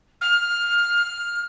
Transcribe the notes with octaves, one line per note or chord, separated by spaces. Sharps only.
F6